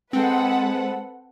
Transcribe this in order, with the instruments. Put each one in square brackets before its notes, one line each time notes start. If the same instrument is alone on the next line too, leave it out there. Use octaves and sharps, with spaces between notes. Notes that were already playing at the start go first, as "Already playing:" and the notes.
[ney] G#3 [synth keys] C4 [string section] A4 B4 F#5